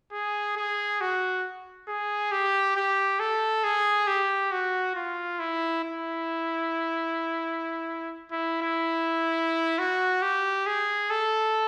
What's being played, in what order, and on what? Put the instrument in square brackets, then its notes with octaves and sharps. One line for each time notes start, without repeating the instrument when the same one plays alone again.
[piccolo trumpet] G#4
G#4
F#4
G#4
G4
G4
A4
G#4
G4
F#4
F4
E4
E4
E4
E4
F#4
G4
G#4
A4